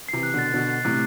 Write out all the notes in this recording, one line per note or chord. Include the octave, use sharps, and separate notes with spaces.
C3 E3 C7
F#6
B2 D3 A6
B2 D3 F#6
C7
A2 C3 F#6